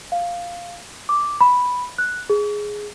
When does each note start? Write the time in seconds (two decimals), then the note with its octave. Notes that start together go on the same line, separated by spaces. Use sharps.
0.12 F5
1.09 D6
1.41 B5
1.98 F#6
2.30 G#4